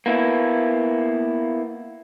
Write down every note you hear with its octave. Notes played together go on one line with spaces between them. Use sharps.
A#3 B3 E4